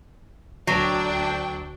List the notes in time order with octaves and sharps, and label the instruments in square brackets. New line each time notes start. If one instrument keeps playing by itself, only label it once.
[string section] D2 D4 G5 [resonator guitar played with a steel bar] F#3